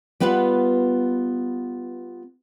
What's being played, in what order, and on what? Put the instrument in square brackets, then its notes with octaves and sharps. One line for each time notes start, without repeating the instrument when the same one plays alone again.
[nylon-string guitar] G3 B3 F4 B4 F#5